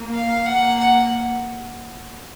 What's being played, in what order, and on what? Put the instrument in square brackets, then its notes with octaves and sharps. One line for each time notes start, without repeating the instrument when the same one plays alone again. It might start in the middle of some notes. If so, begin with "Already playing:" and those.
Already playing: [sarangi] A#3
[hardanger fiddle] F5
[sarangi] A#3 [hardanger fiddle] F#5
[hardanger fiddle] F#5